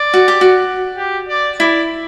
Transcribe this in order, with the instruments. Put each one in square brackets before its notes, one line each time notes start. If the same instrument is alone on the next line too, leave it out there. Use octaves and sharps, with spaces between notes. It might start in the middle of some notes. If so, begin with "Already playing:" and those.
Already playing: [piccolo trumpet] D5
[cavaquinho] F#4
G4
F#4
[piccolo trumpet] G4
D5
[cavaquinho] E4 [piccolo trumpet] D5